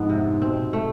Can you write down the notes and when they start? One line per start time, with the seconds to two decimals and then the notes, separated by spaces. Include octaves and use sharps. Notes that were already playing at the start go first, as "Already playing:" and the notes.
Already playing: F2 G#2 B3
0.10 C3
0.41 B2 C4
0.73 A3